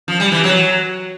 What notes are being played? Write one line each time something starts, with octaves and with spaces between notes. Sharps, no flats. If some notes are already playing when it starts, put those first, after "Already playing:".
F3
G3
E3
F#3